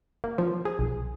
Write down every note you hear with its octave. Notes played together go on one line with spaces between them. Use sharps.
A#3
F3
G#4
B1